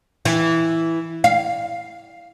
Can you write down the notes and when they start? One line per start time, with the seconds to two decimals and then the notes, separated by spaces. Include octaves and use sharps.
0.25 E3
1.24 F5